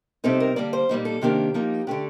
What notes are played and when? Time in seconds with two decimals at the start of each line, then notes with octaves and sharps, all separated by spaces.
0.24 C3 G3 C4 D#4 A4
0.40 A#4
0.56 D3 G3 A#3 D5
0.73 C5
0.89 A#2 G3 A#3 D#4
1.05 A4
1.21 C3 D#3 A#3 D4 G4
1.54 F3 A#3 D#4
1.87 D3 A3 D4 G4